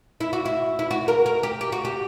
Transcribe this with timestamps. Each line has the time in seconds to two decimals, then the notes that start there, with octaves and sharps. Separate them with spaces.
0.20 E4
0.33 F#4
0.45 E4
0.79 E4
0.91 F#4
1.08 A#4
1.26 A#4
1.43 G4
1.61 G4
1.72 F#4
1.85 G4